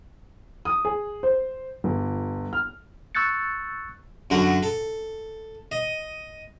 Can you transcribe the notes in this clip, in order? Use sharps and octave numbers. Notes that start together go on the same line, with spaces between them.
D#6
G#4
C5
G1
F6
C#6 E6 F#6 G6 A6 C#7
F#2 D3 F#4
A4
D#5